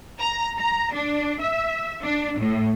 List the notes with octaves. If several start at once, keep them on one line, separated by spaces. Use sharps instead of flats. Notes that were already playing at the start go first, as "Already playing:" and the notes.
A#5
A#5
D4
E5
D4
A2